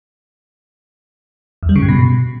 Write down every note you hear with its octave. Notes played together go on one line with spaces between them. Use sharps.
E2
G3
C#3
G2
B2